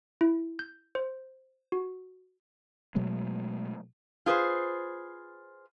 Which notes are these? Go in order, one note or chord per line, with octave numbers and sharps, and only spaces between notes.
E4
G6
C5
F#4
B2 F#3 G#3 A3
F4 G#4 B4 C5